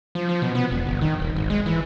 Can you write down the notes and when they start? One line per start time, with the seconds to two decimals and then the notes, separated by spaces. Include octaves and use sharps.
0.15 F3
0.29 F3
0.42 B2
0.55 B3
0.71 E1
0.86 G1
1.01 D#3
1.20 D#1
1.36 G#1
1.50 G#3
1.66 E3